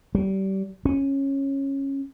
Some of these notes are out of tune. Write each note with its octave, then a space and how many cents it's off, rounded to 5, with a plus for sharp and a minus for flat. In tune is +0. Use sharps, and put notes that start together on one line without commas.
G3 -30
C#4 -15